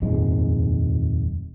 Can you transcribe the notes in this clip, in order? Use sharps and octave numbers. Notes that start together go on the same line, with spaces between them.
D#1 F2 G#2 G#3